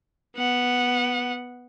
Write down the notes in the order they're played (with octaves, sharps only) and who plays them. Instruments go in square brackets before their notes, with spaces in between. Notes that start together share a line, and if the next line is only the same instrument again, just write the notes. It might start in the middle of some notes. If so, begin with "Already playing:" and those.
[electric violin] B3 F#5